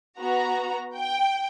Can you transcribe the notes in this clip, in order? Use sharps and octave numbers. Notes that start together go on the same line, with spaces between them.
B3 F#4 A#5
G5